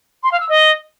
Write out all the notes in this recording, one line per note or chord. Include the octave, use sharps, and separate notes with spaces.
C6
F5
E6
D#5